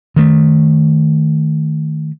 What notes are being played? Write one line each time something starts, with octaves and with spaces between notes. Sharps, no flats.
D#3 A3